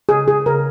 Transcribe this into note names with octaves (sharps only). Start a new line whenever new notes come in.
C#3 G#4
G#4
C#3 A#4